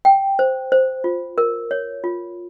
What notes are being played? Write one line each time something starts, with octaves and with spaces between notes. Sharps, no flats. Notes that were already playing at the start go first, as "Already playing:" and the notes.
G5
C5
C5
F4
A#4
C#5
F4